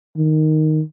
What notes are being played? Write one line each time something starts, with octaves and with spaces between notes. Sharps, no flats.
D#3